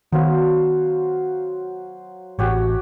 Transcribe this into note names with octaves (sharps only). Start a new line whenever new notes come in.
D#3 F#3 B3 C5 F5
A1 F#4 G4 C#5